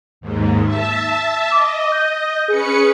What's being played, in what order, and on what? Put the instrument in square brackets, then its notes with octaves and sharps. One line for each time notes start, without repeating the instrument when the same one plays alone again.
[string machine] D#2 G#2
E5 A5
[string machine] D#5 [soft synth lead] D6
[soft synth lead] G6
[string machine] C#4 B4 C#7 [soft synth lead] G#4